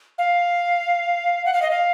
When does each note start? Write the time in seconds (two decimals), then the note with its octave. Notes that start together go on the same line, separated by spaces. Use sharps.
0.18 F5
1.46 F#5
1.53 F5
1.62 D#5
1.71 F5